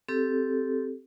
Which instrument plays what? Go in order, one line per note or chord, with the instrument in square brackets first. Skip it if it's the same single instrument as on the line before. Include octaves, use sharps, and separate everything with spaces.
[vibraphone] C4 G4 A4